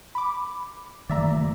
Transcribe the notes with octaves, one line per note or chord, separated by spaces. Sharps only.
B5 D6
F#1 D#3 A3 D5 E5 A#5